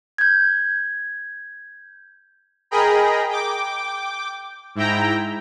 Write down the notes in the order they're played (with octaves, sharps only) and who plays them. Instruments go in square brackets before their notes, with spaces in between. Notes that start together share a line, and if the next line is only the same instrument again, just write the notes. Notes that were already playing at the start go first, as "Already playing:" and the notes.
[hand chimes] G6 G#6
[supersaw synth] G#4 A#4 D#5 G5 A#5 B5
G5 D6
G#2 E4 G5 A#5